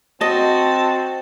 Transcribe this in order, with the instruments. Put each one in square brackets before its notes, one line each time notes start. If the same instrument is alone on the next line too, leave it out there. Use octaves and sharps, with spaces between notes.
[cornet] C4 [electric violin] F#4 [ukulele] D#5 [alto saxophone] A5